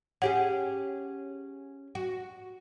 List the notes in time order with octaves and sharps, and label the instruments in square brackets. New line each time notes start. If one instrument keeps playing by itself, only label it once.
[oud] C#4 G4 G#4 [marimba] F#5
[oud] F#4